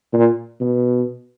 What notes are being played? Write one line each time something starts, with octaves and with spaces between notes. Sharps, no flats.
A#2
B2